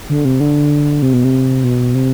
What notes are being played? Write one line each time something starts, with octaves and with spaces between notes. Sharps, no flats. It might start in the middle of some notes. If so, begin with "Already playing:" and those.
D3
C3
D3
C3
B2
C3
B2
C3